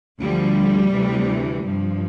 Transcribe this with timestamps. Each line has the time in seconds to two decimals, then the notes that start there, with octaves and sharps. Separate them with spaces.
0.20 D2 D3 F3 G3
0.92 D2 C3 E3
1.64 G2 F3